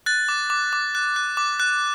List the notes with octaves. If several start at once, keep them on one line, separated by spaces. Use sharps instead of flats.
F#6 A6
D6
D6
D6
F#6
F#6
D6
F#6